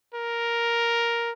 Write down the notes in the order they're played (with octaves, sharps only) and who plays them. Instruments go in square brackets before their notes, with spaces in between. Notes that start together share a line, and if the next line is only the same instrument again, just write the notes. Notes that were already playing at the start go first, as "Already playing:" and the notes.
[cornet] A#4